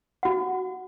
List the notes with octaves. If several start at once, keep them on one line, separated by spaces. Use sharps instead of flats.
F#4 F#5